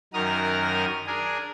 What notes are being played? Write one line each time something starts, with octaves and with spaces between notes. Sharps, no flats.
F#2 D#3 F#4 A#4 D#6 F6
D4 G#4 A#4 G#5